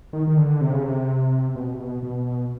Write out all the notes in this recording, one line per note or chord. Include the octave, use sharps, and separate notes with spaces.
D#3
D#3
D3
C3
C#3
C3
B2
C3
B2
B2